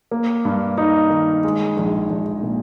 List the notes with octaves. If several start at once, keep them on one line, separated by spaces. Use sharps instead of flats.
A#3
G2
D#4
D#3
G#3
A#1
A#1
A#2